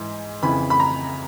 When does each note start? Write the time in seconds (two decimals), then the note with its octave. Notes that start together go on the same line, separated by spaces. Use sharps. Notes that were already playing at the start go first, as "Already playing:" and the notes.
Already playing: G#2 E3
0.42 F2 C#3 E3 B5
0.70 B5
0.80 A#5